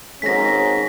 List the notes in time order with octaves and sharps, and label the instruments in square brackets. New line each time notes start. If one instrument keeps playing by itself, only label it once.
[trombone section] G#1 G#2 C#4 [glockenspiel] A#6 B6